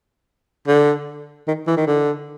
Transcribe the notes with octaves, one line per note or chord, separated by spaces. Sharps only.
D3
D#3
E3
D#3
D3